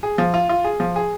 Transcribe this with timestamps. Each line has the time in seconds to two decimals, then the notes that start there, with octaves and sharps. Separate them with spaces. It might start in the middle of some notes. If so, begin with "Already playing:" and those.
0.03 G#4
0.18 F3
0.34 F4
0.49 F4
0.64 G#4
0.80 F3
0.96 G#4